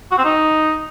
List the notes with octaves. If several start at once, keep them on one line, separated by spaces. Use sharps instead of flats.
F#4
C4
D#4